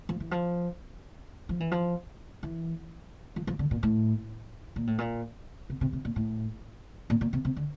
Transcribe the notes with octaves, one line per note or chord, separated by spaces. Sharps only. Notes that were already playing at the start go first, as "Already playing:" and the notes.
F3
E3
F3
F3
E3
F3
E3
F3
F3
D3
A#2
A2
A#2
A2
A#2
C3
C3
C3
A#2
A2
A#2
A#2
C3
C3
D3